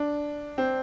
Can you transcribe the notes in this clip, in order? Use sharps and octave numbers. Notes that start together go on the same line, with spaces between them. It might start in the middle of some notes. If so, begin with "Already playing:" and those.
Already playing: D4
C4